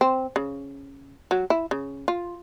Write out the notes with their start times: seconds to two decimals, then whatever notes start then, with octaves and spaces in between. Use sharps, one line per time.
0.01 C4
0.36 C#3
1.31 F#3
1.50 E4
1.71 C#3
2.08 F4